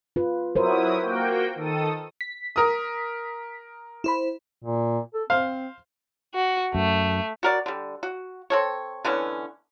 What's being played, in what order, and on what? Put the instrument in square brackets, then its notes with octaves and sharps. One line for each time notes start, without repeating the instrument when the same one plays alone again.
[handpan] F4 B4
[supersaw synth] F#3 E4 D#6 [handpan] A#4 C5
[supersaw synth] A#3 F#4 G5
D#3 A4 D#6
[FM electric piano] B6
[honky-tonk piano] A#4 D#6
[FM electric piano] E4 C5 B5
[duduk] A#2
A4
[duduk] C4 [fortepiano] C5 F5
[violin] F#4
[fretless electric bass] F#2 [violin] A3
[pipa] F#4 A#4 D5
D3 G3
F#4
C4 A4 C#5
D3 E3 B3 C#4